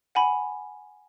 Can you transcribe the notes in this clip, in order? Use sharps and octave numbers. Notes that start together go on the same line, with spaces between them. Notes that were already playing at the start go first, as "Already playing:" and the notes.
F#5 G#5 B5